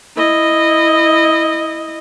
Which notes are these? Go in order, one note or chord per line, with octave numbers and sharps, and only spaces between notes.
E4 D#5